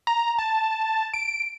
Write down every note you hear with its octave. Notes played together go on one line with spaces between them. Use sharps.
A#5
A5
D7